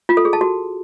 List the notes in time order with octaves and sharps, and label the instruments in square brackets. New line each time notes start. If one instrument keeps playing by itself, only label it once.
[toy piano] F4
A4
G#4
A5
F#4